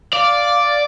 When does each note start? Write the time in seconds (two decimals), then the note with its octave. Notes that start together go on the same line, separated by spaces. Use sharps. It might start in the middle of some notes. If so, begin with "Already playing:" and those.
0.13 D5 F5